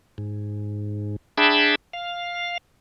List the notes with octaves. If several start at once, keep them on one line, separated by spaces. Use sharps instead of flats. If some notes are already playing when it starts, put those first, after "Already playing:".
G#2
D4 G#4 E5 G5 A5 B5
F5